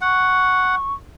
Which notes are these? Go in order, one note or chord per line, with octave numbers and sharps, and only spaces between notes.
F#5 C#6